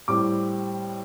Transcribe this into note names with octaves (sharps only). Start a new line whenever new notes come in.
A2 G3 C4 D6